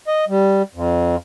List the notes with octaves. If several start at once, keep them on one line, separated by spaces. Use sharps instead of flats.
D#5
G3
F2